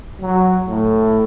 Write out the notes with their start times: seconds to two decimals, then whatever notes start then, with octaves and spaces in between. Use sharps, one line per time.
0.21 F#3
0.67 A2